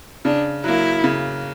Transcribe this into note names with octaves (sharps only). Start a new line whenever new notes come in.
C#3 D4
F#3 A#3 E4
C#3